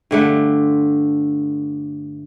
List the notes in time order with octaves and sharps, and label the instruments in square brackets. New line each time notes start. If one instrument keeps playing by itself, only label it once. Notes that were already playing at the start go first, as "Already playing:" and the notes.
[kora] G2 D3 A3